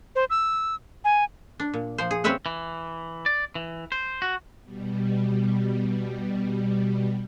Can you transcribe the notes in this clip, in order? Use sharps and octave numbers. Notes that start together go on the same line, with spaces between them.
C5
E6
G#5
D4
A#2
F3 C5
G#4
G3 C4 C#4 B4 E5 F#5
E3
D5
E3
C5
F#4
B2 G3